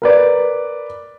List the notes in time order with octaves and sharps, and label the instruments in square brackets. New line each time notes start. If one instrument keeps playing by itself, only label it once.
[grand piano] A#4 B4 D5